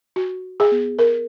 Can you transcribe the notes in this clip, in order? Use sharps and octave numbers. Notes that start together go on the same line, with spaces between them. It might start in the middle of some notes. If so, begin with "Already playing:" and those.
F#4
G#4
B3
A#4